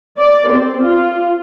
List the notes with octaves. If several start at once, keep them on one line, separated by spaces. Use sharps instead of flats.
D5
C4
F4